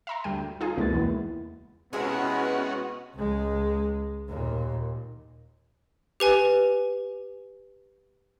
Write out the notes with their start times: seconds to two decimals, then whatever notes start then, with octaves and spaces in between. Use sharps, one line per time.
0.07 E5 A#5 C6
0.24 D2 G3 G5
0.61 D#4 F4 G#4
0.77 C#2 B2 G#3 A#3 E4 A6
0.92 E2 B3
1.93 C3 G#3 B3 C#4 E4 F#4 G#4
3.14 C#2 G#3
4.28 D#2 A#2
6.20 G4 B4 G#5